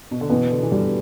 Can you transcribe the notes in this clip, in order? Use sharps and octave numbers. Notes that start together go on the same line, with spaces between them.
B2
D3
B2 E3 B3
D3
E3
D3 G3